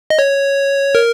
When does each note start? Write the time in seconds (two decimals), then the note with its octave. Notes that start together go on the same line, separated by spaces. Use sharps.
0.10 D#5
0.19 C#5
0.95 A#4